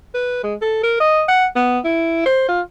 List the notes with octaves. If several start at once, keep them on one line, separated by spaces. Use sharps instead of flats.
B4
G#3
A4
A#4
D#5
F#5
B3
E4
C5
F4